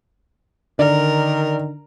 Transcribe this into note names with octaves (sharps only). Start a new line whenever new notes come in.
D3 D#3 A#4 D5